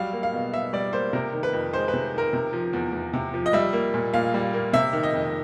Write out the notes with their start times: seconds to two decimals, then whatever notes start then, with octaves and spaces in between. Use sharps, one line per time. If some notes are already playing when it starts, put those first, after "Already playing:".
Already playing: F#3 G3 F5
0.13 A#3
0.23 F5
0.33 B2
0.54 B2 E5
0.73 G3 D5
0.93 A#3 C5
1.13 C3 A#4
1.33 D#3
1.43 B4
1.53 F2
1.73 G#3 C5
1.88 B4
1.94 C3
2.14 D#3 A#4
2.33 C3
2.53 F3
2.73 E2
2.93 E2
3.13 C3
3.34 F3
3.46 D#5
3.53 G3 E5
3.73 A#3
3.94 A#2
4.14 A#2 F5
4.34 G3
4.54 A#3
4.73 C3 E5
4.93 D#3
5.03 D#5
5.14 F2